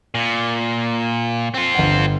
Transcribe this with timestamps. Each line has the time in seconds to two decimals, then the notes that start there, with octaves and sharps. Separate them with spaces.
0.15 A#2
1.54 C4 F4
1.75 G1 F#5